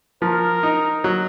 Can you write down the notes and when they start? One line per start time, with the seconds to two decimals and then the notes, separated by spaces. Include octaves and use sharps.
0.22 F3 A#4
0.63 D#4
1.04 F#3